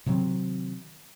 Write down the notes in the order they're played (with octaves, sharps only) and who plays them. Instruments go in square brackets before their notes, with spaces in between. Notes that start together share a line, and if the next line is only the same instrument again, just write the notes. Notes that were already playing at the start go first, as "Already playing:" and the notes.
[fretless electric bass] C3 D#3 F#3 C4